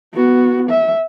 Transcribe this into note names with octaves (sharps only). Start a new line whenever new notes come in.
B3 F#4
E5